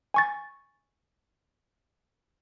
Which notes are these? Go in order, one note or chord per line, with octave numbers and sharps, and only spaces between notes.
G#5 C#6 A6